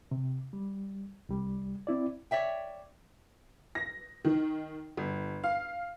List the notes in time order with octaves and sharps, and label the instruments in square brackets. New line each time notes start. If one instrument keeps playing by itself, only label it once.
[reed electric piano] C3
G3
C2 G3
C4 E4 D5
[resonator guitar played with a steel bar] C#5 D5 E5 G5
[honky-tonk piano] A#6
D#3
G1
F5